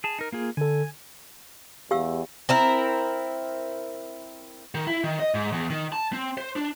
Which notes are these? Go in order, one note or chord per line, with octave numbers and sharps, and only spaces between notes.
G#4 A5
D#4 A#4
A#3 F4 G#4
D3 A4 G#5
E2 G4 F5 E6
C4 E4 A#4
D#3
E4
D#3
D#5
G#2
E2
D#3
A5
C4
C5
D4